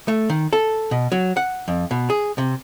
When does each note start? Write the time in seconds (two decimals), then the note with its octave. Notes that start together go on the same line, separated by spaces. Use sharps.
0.08 A3
0.30 D#3
0.53 A4
0.91 B2
1.12 F#3
1.37 F#5
1.68 F2
1.91 B2
2.10 G#4
2.38 C3